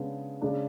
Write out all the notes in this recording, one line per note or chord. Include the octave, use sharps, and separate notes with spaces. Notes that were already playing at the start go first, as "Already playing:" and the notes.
Already playing: C#3 G#3 B3 D4
C#3 G#3 D4